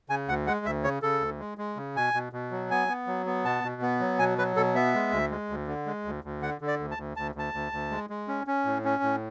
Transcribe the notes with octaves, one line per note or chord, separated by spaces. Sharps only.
C#3 G#5
D2 F#5
G#3 F#5
D2 E5
C#3 C#5
C#3 A4
D2
G#3
G#3
C#3
B2 G#5
B2
B2
F#3
B3 G#5
B3
F#3
B3
B2 A5
B2
B3
F#3
B2 G#5
F#3 B4
B2 A4
B3 E5
G#3
D2
G#3
D2
D3
G#3
D2
D2
D3 F#5
D3
D5
D2
A5
D2
D2 A5
D2 A5
D2
D2
G#3
G#3
C#4
C#4
A2
C#4
A2